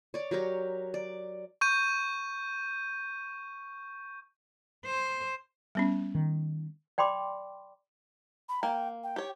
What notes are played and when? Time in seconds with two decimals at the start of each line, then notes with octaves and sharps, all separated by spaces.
0.14 C#5 D5
0.31 F#3 G4 A#4 C#5
0.94 D5
1.61 C#6 G6 D#7
4.85 C5
5.75 G3 B3 C#4
6.15 D#3
6.98 D5 G5 B5 C6 D6
8.49 B5
8.63 A#3 G5
9.04 G5
9.16 G4 C#5